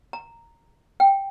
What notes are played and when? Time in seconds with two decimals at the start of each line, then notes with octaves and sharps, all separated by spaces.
0.13 A#5
1.00 G5